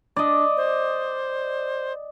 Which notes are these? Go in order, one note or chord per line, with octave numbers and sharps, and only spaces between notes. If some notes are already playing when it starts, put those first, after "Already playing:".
D4 D5 D#5
C5